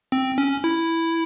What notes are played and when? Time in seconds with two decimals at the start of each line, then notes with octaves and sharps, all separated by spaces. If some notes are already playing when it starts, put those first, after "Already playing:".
0.12 C4
0.38 C#4
0.64 E4